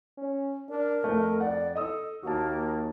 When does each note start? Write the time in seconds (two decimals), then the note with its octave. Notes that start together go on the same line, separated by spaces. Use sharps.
0.18 C#4
0.69 D4 A#4
1.04 F2 A3
1.40 D5 F#5
1.75 A4 D#5 D#6 E6
2.23 D#2 A#3 F#4 A5